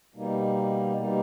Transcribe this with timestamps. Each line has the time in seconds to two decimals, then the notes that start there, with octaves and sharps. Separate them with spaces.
0.14 B2 G3 A#3 D#4
0.97 B2 G3 A#3 D#4